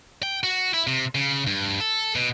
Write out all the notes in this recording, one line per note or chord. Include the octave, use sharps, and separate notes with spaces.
G5
F#4
E4
C3
C#3
G2
A4
B2